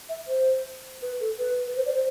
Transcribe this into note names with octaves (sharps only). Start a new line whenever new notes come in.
E5
C5
B4
A4
B4
B4
C5
D5
C5